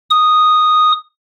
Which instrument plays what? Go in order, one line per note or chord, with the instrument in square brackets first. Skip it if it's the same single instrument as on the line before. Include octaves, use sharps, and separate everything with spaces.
[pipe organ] D#6